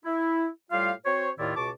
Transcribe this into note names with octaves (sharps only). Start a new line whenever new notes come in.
E4
A2 G3 F4 G4 F5
C4 F#4 C5 C#5
D#2 A2 D#3 E4 F4 D5
C#2 B2 A5 C#6 D6